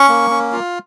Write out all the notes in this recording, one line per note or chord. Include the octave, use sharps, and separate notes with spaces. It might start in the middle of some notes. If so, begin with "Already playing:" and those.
Already playing: C#4 C#6
A#3
C#4
F4